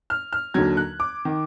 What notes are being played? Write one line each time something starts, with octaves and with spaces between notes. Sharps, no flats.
F6
F6
D#2 D3 F#3 G#6
F#6
D6
D#3